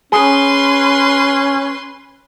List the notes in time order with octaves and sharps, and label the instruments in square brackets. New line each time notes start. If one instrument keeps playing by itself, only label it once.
[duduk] C#4 [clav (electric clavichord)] G#4 [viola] B4 C6